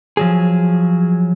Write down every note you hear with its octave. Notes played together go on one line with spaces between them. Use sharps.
F3 F#3 G#4